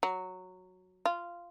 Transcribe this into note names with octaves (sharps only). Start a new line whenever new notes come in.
F#3
F4